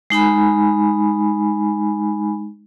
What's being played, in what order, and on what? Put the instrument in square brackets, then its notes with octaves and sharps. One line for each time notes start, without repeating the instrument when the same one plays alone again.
[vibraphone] G#3 D#4 G#5 B5